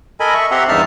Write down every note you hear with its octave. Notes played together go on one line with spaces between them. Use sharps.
A4 A#4 D#5 G#5 B5
E5 C#6
C4 G4 E5 F#5 A#5 C6
E2 G2 D#4 E5 A5 F6